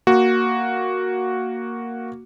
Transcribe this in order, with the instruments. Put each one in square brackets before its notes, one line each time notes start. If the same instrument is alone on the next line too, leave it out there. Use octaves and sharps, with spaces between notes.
[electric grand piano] A#3 F#4